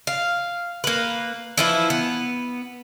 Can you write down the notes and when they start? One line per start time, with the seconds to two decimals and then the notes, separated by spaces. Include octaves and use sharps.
0.07 F5
0.84 A#3 B4
1.58 E3 F3 E4
1.90 B3